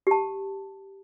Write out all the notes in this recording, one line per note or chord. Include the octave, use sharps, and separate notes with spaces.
G4 A5